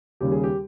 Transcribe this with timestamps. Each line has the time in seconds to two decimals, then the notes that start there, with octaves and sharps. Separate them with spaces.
0.21 D#2 C#3 G3 G4
0.32 G#4
0.43 G4